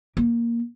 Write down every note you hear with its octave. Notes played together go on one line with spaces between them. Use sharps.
A#3